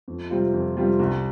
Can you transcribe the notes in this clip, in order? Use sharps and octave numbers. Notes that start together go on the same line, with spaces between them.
F2
C3 G3 C4 F4
F2
C3 G3 C4 F4
C2